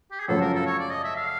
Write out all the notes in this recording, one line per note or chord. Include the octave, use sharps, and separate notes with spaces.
G4
G#4
F#2 C#3 F3 A3 C#4 A4
A#4
A4
C#5
D5
D#5
E5
F5